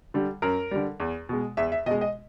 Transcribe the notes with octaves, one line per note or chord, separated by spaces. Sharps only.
D3 G3
F#2 A#4
D3 G3
E2
B2 G#3
E2 E5
E5
B2 G#3 D#5
D#5